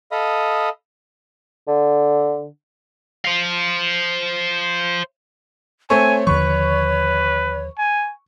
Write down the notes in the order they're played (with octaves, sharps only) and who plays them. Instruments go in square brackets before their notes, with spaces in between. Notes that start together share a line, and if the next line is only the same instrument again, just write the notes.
[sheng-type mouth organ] A4 D#5 F5 B5 D#6
[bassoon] D3
[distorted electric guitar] C5 F5
[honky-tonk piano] A3 C4 C#6 [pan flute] C#5 [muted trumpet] G#5
[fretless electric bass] D#2 D3 F3 [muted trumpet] B4 [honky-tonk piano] C#6
[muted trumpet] G#5